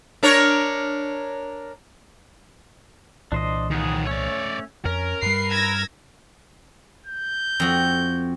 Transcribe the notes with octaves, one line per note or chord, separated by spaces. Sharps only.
D4 A#4 C#5
C2 A#2 E3 D4 C5 D#5
D#3 B3 G#4
A3 C#4 C#5 D5
F2 C#4 A#4
G2 G3 B4 C7
E6 G#6 A#6
G6
F2 F#4